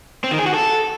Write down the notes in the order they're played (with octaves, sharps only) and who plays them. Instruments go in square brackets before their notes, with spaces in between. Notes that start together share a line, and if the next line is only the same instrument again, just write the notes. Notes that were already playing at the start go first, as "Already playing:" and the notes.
[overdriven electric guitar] C4
D#3
G#4
F#4
A4